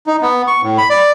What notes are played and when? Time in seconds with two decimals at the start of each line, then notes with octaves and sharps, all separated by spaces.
0.07 D#4
0.22 B3
0.47 C#6
0.63 A2
0.78 B5
0.90 D5